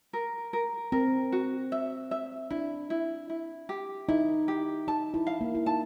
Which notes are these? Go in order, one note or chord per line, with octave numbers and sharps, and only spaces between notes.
A#4
A#4
C4 A#4
F#4
E5
E5
D4 E4
E4
E4
G4
D#4 E4
G4
D#4 A5
E4
F5
A#3
E4
D#4 A5